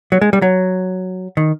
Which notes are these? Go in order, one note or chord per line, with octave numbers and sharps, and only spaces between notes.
F#3
G#3
G3
F#3
D#3